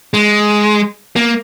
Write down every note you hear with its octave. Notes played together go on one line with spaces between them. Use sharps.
G#3
A#3